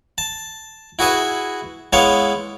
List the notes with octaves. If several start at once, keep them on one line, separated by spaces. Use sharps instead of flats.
A5
E4 F#4 G#4 B4 E5
G#3 B3 E4 C#5 F5